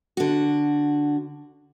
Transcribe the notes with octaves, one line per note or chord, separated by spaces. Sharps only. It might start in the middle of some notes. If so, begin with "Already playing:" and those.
D3 F#4